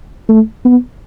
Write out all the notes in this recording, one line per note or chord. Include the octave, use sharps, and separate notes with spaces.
A3
B3